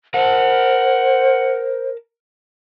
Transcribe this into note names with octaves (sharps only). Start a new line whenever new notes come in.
A#4 C5 F#5 A5